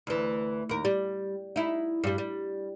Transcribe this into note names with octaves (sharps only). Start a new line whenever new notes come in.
D2 E3
D#2 A#4
G3
D#4 E4
G2 G3
G3